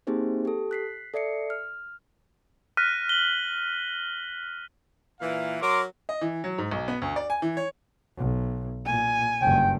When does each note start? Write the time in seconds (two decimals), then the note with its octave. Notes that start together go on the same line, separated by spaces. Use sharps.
0.07 A#3 C4 D#4 G4 G#4 C5
0.45 G4 A4
0.71 F#6 B6 C7
1.14 A4 D5 E5 C7 C#7
1.50 F6
2.77 F6 F#6 A#6 B6 D#7
3.09 F#7 G7
5.21 A#2 E3 F5
5.61 F#3 A#4 C6 D6
6.09 D#5
6.21 E3
6.44 F#3
6.58 G#2
6.71 B1
6.88 B3
7.02 D2
7.16 D5
7.30 G#5
7.42 E3
7.57 C#5
8.17 B1
8.86 A#2 G#5
9.41 F#1 G2 G5